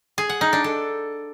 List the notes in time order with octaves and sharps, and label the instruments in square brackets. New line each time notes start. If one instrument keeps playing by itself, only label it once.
[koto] G#4
F#5
D#4
D4
A4